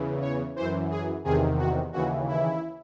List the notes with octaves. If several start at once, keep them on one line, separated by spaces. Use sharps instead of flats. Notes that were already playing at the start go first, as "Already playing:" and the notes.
Already playing: E2 C#3 E3
C#5
F#2 E3 C5
G#4
E2 C3 D#3 G#4
F#4
D#2 C#3 E3 F#4
E4